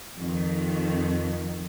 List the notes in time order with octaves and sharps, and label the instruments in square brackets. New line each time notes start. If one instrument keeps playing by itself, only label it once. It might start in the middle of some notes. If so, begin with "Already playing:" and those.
[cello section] F2 D#3